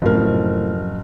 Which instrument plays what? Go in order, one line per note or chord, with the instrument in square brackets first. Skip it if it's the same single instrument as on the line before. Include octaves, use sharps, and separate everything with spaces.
[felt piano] F#1 A#4 [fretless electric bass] A2 C3 F3